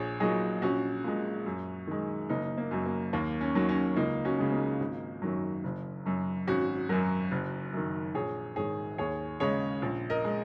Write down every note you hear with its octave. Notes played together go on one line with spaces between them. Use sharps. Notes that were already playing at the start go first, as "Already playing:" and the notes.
Already playing: A#1 G#4 C#5
A#2 F#3 D#4 G#4
A#1 C#4 F#4
A#2 G#3
F#2
D#3 G#3
F#1 A#3 D#4
A#3
F#2 F#3
A#3
D#2 A#3
C#4
D#3 F#3
C#4
C#4
C#2 A#3 D#4
C#4 F#4
C#3 G#3
A#3 D#4
G#1
F#2 D#3 F#3
F#1
F#2 F#3
G#1 C#4 F#4
F#2 F#3 F#4 A#4
F#1
F#2 D#3
A#1 G#4 C#5
G#2 D#3 G#4 C#5
D#2 G#4 C#5
C#3 G#3 G#4 C#5
A#1
A#4 D#5
G#3